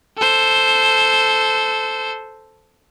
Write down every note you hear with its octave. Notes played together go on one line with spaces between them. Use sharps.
A4 C5